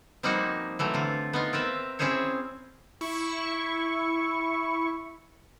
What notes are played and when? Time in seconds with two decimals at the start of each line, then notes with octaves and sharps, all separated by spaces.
0.23 F3 G3 A#3 C4 D#4 F#4
0.79 E3 F#3 A3 C4
0.94 D3 F4
1.33 B3 D#4 F4
1.53 C4 A#4 B4 E5
1.99 C4 C#4 E4 G#4 C5 C#5
3.01 E4 C#6